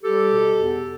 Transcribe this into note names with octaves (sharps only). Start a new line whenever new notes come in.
G3 G4 A4
B2
E2